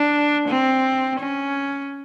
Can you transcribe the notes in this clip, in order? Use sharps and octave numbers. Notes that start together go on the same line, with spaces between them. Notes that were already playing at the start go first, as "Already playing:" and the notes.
Already playing: D4
C4
C#4